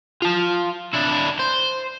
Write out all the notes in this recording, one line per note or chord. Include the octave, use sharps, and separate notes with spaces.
F4 A5
D4 E4
C5